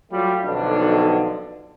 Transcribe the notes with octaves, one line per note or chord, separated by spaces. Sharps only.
F#3 G3 A3 F4
B1 F2 D3 D4